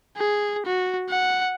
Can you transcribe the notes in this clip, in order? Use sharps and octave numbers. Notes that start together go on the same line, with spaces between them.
G#4
F#4
F#5